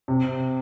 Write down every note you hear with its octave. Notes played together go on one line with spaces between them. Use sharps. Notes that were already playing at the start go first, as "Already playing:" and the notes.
C3